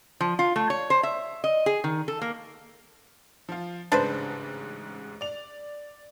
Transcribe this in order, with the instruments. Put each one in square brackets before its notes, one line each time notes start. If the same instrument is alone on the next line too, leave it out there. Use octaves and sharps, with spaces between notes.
[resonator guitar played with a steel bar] F3
F4
A3
C#5
C5
E5
D#5
G#4
D#3
A4
A#3
[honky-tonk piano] F3 F4
[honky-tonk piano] A1 G#2 C#3 [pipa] D4 B4 C5
[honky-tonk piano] D5 F7